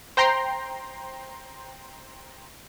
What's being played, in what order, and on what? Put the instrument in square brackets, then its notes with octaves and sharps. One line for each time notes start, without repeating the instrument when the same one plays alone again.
[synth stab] C5 G5 A#5 C6